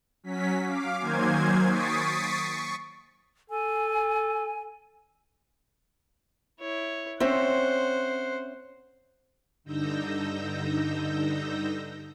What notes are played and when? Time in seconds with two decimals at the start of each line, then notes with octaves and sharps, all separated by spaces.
0.23 F#3 C#4 B6
0.65 F5 D6
0.99 D#3 F#3 A#3 C5 G#5 G#6
1.68 C#6 D#6 A6 B6 C7 D7
2.40 C#6
3.50 A4 G#5
6.60 E4 C#5
7.20 C4 C#4 C5 E5 F#5
9.64 G2 D3 D#4 E6 G6 A#6